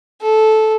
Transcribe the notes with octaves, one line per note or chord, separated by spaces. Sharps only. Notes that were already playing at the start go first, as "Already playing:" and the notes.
A4